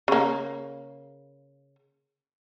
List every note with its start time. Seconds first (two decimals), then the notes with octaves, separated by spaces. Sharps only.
0.08 C#3 A#3